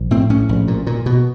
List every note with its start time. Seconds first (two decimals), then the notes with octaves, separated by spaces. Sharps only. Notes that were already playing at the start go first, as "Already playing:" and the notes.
Already playing: A#1
0.11 A2 C4
0.30 A2 C#4
0.49 A#1
0.68 A#2
0.87 A#2
1.06 B2